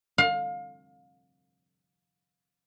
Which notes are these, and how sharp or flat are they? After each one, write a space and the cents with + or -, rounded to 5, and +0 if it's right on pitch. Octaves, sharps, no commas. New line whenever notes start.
F5 +30